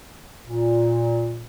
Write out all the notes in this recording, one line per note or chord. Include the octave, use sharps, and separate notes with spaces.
A#2